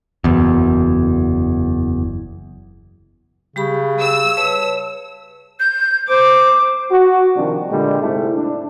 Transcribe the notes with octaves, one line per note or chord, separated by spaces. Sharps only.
F#1 E2
C#3 G3 G4 B5
E6
B4 C#5 A5
G6
C5 D6
F#4
C3 D#3 F3 G3 D4
A#2 D3 G3 G#3
G#2 C3 A3 E4
D4